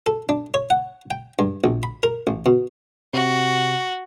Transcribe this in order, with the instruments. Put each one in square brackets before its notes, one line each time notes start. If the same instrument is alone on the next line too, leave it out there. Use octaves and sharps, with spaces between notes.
[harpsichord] A4
D4
C#5
F#5
G5
G2
A#1
B5
A#4
A1
B2
[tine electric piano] C3 C4 [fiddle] F#4